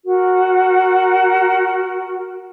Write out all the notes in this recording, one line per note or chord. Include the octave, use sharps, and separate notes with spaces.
F#4 A#4